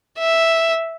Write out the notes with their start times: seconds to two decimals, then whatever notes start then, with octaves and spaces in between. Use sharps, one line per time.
0.19 E5